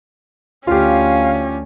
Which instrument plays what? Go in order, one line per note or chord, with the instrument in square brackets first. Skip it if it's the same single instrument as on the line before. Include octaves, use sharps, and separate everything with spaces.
[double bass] D2 [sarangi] C#4 [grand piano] F4 G4 [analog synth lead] F5